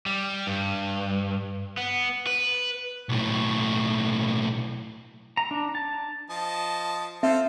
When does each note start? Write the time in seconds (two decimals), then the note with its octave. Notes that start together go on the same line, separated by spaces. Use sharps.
0.06 G3
0.47 G2
1.77 B3
2.27 B4
3.09 B1 A2
5.37 A#5
5.51 D4
5.75 A5
6.30 F3 D#5 A5
7.23 C4 F4 A4 C5 E5